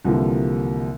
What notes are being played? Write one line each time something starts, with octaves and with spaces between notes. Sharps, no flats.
C2 D3 E3 F3 G3 A#3